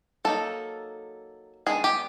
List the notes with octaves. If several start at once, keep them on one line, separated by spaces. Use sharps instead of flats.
F#3 A#3 D#4 A4
D#3 G#3 B3 D4 G#4
G4